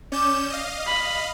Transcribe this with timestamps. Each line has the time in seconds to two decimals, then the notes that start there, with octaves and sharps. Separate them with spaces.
0.12 C#4 D5 G6 E7
0.50 D#5 F5
0.86 B5